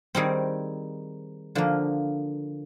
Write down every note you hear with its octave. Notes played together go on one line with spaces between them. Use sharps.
D#3 G3 C4 D#4 G#4
D3 F3 A#3